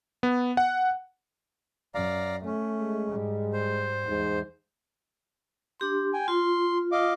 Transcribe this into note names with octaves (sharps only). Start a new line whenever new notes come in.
B3
F#5
F#2 D5 F5 A#5
A3 C#4
G#3
G#2 G3
C5
E2 G#2
D4 G4 C6
G5 G#5
F4 C6
D#5 F5 D6